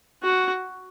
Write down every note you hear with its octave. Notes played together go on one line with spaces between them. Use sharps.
F#4